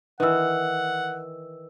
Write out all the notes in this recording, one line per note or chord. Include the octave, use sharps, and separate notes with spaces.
D#3 E3 B4 F#5 E6